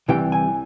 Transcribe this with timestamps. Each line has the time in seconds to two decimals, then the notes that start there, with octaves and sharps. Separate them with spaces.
0.08 C2 C3 E3 G3 G5
0.32 G#5